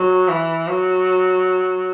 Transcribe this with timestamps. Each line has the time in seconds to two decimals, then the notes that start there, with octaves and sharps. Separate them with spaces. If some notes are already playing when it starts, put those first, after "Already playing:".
Already playing: F#3
0.29 E3
0.68 F#3